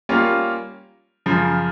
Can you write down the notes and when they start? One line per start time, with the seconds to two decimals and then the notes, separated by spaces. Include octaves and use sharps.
0.09 G3 A#3 C#4 F4
1.26 F#2 C#3 F3